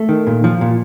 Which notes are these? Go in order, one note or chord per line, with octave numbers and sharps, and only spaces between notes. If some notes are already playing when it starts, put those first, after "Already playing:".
Already playing: A3
D#3
A#2
F3
A#2